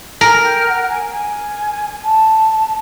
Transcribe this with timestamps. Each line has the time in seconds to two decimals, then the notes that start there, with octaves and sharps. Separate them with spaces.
0.21 A#4 G#5
0.43 G5
0.66 G5
0.69 F#5
0.89 G#5
1.11 G#5
2.02 A5